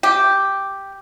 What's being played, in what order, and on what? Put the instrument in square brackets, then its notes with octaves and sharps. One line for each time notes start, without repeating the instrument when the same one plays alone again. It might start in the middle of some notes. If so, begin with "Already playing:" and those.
[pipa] G4